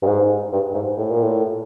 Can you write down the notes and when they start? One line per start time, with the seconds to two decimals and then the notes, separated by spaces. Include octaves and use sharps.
0.03 G2
0.06 G#2
0.53 G2
0.74 G#2
0.98 A2
1.11 A#2
1.23 A2